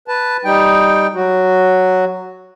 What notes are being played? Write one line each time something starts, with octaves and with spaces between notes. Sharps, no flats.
B4 A5
G3 D#4 G5
F#3 F#4